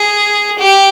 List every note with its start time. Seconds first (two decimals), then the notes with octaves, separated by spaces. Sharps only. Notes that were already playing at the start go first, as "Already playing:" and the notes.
Already playing: G#4
0.59 G4